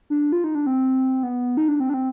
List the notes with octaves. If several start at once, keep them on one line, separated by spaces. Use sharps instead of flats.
D4
F4
D#4
D4
C4
B3
D#4
D4
C4
D4
C4